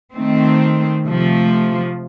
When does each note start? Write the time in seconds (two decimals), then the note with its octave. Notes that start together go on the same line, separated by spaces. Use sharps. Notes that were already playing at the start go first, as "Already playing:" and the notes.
0.14 D#3 A3 C4
1.04 C3 F3 A3